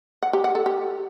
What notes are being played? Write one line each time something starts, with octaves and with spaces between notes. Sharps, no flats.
F#5
G4
F#5
A4
G4